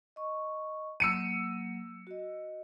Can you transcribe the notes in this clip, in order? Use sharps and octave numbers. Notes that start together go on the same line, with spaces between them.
D#5 C#6
F#3 A#3 E6 C#7 D#7
F#4 D#5